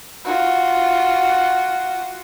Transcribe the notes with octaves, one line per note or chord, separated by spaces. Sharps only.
F4 F#4